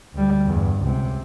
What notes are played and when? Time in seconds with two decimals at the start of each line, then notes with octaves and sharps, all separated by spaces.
0.15 D2 G3
0.46 E2 G2
0.81 C#2 C3